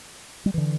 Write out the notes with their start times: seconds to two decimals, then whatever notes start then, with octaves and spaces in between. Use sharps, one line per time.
0.46 G3
0.54 D3 E3